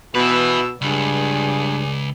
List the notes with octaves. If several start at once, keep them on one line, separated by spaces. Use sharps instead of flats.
B2 B3 E4 B4 E6
C#2 G2 G#4 D5